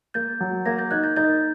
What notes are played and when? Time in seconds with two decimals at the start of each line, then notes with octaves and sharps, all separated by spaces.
0.14 A#3 G6 A6
0.40 F#3
0.66 A#3 G#6 A#6
0.78 G6 A6
0.91 D#4 F#6 G#6
1.03 G6 A6
1.16 D#4 G6 A6